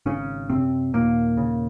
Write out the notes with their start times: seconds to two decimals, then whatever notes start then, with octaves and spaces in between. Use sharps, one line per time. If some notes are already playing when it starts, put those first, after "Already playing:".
0.06 G#1 C#3 C#4
0.50 F#2 C3 C4
0.93 D#2 A#2 A#3
1.37 C#3